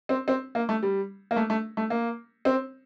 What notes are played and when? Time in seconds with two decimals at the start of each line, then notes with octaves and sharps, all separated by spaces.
0.09 C4
0.28 C4
0.55 A#3
0.69 A3
0.83 G3
1.31 A#3
1.36 A3
1.50 A3
1.77 A3
1.90 A#3
2.45 C4